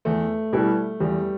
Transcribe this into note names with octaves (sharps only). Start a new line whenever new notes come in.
E2 A3
B2 G3 B3 E4
E2 G3